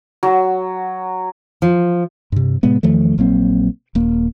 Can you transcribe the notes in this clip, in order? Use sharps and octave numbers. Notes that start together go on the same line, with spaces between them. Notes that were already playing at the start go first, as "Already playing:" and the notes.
F#3
F3
G2 C3
A2 C3 G#3 B3
E2 D#3 F3 A3
A#1 F#3 A#3 C4
D#1 A#3